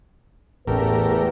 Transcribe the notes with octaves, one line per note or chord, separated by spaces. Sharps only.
A1 E2 A3 C#4 G4 A#4 B4